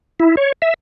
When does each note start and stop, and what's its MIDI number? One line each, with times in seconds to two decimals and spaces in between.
0.20 0.36 64
0.37 0.52 73
0.62 0.74 76